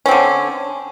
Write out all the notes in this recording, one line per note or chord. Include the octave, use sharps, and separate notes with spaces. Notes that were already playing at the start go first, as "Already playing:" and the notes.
D3 C4 C#4